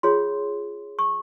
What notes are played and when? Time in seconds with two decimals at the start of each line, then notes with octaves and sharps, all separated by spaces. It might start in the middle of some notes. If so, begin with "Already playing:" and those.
0.03 F4 G#4 C#5 C6
0.99 C#6